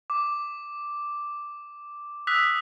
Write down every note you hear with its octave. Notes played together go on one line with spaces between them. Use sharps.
D6
D#6 E6 F#6 B6